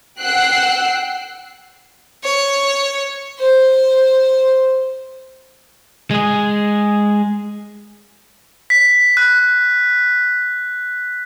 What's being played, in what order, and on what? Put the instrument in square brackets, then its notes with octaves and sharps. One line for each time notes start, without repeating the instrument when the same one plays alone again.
[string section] F#5 G5 E6 F#6 C7
[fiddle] C#5
C5
[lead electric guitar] G#3 G#4
[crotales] B6
F#6